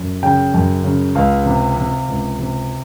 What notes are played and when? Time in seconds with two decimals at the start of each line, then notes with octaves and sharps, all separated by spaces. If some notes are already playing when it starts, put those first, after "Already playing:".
Already playing: F#2
0.23 C#3 G5
0.54 F#2
0.84 C#3
1.15 C#2 F5
1.46 C3
1.77 C3
2.08 C#2
2.39 C3